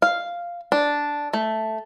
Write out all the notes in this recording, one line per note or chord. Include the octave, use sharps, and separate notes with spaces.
F5
D4
A3